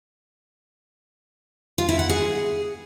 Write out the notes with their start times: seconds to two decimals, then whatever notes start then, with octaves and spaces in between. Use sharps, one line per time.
1.78 F4
1.89 E4
1.99 F#5
2.09 G#4